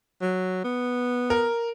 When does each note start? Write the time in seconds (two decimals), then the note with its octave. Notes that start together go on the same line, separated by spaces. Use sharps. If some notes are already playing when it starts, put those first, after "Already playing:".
0.21 F#3
0.65 B3
1.30 A#4